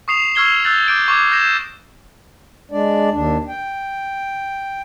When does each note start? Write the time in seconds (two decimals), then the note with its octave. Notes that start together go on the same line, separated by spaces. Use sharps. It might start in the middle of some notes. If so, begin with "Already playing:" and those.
0.08 C#6 D#6 C7 E7 F7
0.35 C#6 E6 F6 G#6 C7 G7
0.64 E6 F#6 G6 A6 F#7
0.88 D6 G6 D7
1.08 C#6 D6 G#6
1.32 G6 G#6 A#6 C7 E7
2.71 G#3 D4 D5
3.11 D#2 D4
3.48 G5